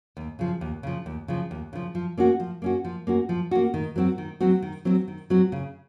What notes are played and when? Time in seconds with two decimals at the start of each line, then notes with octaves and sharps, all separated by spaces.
0.17 D#2
0.39 C#3 F3
0.61 D#2
0.83 C#3 F3
1.06 D#2
1.28 C#3 F3
1.51 D#2
1.73 C#3 F3
1.95 F3
2.18 A#3 C#4 F#4
2.40 F3
2.62 A#3 C#4 F#4
2.85 F3
3.07 A#3 C#4 F#4
3.29 F3
3.51 A#3 C#4 F#4
3.74 D#3
3.96 F#3 C4 F#4
4.18 D#3
4.41 F#3 C4 F#4
4.62 D#3
4.85 F#3 C4 F#4
5.08 D#3
5.30 F#3 C4 F#4
5.52 C#3